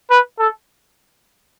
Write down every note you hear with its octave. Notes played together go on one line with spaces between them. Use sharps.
B4
A4